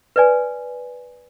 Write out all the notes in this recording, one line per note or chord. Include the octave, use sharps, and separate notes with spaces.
B4 D5 G#5